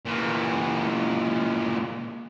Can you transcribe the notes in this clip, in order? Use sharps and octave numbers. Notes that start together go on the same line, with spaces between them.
A#2 E3